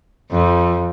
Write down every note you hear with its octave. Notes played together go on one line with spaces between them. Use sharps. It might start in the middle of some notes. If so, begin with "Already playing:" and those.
F2